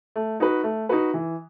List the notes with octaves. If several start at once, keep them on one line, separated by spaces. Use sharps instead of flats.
A3
D#4 F#4 B4
A3
D#4 F#4 B4
E3